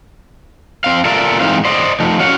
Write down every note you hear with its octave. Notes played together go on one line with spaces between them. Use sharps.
C4 F5
F4 A4 A#4 D5 E5
G#2 E3 C4 D#4 F5
C5 D5 D#5
F3 A3 D#4
C#4 F#4 C#5 F5 F#5